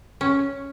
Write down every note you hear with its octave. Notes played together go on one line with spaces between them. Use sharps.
C#4